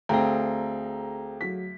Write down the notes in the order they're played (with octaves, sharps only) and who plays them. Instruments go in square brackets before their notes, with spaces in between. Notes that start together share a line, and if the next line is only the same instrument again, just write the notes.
[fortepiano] D2 [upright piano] C4 G5 A#5 [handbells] G#4 A4 F5
[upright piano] F#3 F#4 B6